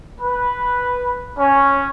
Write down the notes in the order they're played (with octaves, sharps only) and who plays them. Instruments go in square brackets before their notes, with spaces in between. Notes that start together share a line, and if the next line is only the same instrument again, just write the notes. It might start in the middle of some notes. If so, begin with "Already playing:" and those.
[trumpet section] B4
C#4